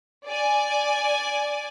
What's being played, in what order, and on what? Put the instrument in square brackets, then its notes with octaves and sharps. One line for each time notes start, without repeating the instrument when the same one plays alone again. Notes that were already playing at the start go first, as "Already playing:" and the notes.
[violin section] D5 G#5